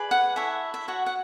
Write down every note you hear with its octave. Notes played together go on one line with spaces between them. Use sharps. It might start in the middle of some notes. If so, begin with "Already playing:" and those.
Already playing: G#4 B4 D5
F#5
E4 A4 C#5 E5
E5
F#4 C#5 F#5
F#5